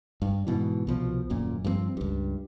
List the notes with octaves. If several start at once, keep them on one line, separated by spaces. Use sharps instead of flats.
G2
G#2 B2 E3
C2 B2 F3
D#1 F#2 A#2
G2 F3 F#3 C4
C#2 G2